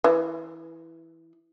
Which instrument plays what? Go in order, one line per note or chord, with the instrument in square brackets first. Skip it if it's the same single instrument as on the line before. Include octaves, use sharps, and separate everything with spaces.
[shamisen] E3